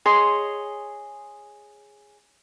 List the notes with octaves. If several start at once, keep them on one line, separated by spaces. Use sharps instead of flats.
G#4 C#5 D#5 C6